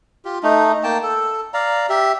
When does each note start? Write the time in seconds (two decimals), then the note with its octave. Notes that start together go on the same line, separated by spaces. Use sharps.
0.25 F4 G4
0.43 A3 D#4
0.84 A#3 G5 A5
1.03 A4
1.54 D5 F5 A#5
1.89 G4 E5